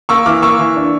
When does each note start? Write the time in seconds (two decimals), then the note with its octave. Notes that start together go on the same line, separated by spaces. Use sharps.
0.09 A#3 C#6 E6
0.26 E3 D6 F6
0.42 A#3 C#6 E6
0.59 E3
0.76 D4